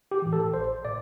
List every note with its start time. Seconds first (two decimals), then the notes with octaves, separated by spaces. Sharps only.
0.11 G4
0.22 A2 E3
0.33 A4
0.53 A1 C5
0.85 A2 D5